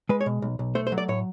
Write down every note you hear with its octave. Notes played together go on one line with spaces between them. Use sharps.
G#3 B4
C#5
B2
B1
B1
A3 C5
C5
F#3
D5
A2 C#5